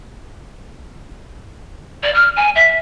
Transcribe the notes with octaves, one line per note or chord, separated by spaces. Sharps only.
D5
F6
G#5
E5